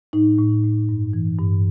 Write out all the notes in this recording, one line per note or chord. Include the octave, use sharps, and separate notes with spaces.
A2 D#4
A2
A2
G2
E3
G2